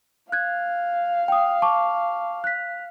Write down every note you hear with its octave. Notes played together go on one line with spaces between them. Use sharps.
F5 F#6 G#6
G5 D#6
A5 C#6 D6
F#6 B6